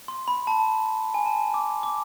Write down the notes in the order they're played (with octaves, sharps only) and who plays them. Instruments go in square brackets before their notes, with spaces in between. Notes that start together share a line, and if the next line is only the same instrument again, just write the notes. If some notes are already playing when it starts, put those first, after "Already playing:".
[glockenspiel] C6
B5
A5
G#5
A5
D6
D6